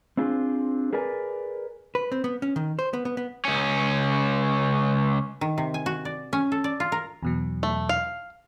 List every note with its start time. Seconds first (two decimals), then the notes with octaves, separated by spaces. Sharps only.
0.17 C4 D4 F4 G#4
0.93 G#4 A#4 B4 D5 G#5
1.95 B4
2.12 C4
2.24 B3
2.42 C#4
2.56 D#3
2.79 C5
2.93 B3
3.05 B3
3.17 B3
3.45 C#2 C#4
5.41 D#3
5.58 C3
5.74 G#5
5.86 F#4
6.05 D5
6.33 C#4
6.52 A4
6.64 D5
6.80 F4
6.92 A#4
7.23 E2 B2 F#3
7.63 A3
7.89 F5